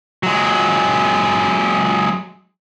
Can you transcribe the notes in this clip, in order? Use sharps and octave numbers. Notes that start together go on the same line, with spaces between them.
F#3 G#3